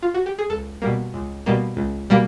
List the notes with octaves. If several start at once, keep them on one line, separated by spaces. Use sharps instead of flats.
F4
F#4
G4
G#4
C#2 A4
B2 G3 A#3
C#2
B2 G3 A#3
C#2
B2 G3 A#3